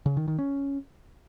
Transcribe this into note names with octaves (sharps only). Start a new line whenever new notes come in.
C#3
D#3
D#3
C#4